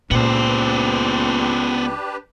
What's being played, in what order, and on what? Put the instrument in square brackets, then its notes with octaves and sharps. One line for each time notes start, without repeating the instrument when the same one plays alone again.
[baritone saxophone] C#2 [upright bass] A#2 [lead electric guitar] B3 C5 [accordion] D4 G4 B4